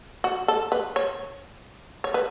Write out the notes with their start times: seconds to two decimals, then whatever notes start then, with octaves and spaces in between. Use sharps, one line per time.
0.24 F#4
0.48 A4
0.72 B4
0.96 C#5
2.04 C#5
2.14 B4